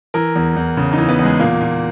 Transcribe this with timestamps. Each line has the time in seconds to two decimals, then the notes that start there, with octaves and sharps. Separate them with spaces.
0.14 E3 A#4
0.36 E2
0.56 E2
0.77 C#3
0.93 D#4
0.98 E3
1.09 B3
1.19 E2 G#3
1.39 A#2 A#3
1.61 A#2